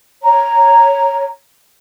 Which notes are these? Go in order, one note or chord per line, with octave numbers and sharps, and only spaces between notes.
C#5 A#5